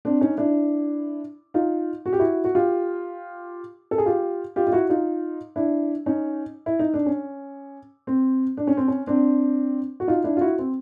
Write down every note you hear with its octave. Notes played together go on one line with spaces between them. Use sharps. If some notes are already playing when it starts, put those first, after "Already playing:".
C4 D4
C#4 D#4
D4 E4
D#4 F4
F#4
G4
E4 F#4
F#4
F4 G4
A4
G#4
F4 G4
F4 G4
F4
E4 F#4
D#4 F4
D4 E4
C#4 D#4
E4
D#4
D4
C#4
C4
D4
C#4
C4
C#4
C4 D4
F#4
D#4 F4
D4 E4
F4
E4 F#4
C4